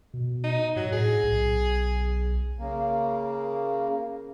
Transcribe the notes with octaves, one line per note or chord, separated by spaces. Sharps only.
B2
D#4
G#2 F#3
A2 G#4
B1
C#3 A#3